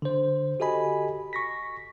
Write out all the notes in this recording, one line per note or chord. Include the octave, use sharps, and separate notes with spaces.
D3 C5
F#4 G4 A4 D#5 G#5 B5
C#6 A#6 B6